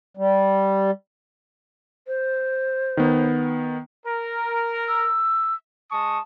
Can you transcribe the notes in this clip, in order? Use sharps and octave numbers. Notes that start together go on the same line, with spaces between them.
G3
C5
D#3 B3
A#4
E6
G#3 A5 C#6 D#6